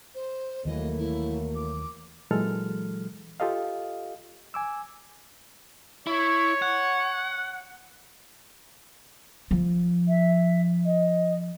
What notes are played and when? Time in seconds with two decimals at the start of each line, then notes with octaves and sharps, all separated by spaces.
0.14 C5
0.65 D#2 E3 F#3 A3 A#3 D#5
0.98 E4
1.55 D6
2.31 A#2 E3 F#3 G#3 A4 F6
3.40 F4 G4 A4 D#5 F5
4.54 G#5 D6 E6
6.07 E4 C#5
6.62 F#5
9.51 F3
10.08 E5
10.85 D#5